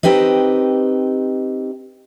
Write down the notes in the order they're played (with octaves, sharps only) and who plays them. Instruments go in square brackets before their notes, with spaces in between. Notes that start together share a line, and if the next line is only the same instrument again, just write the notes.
[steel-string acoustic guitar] C4 D#4 G4 B4 D#5